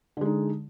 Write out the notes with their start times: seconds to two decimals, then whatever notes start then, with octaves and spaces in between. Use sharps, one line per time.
0.17 D3
0.21 G#3
0.25 D#4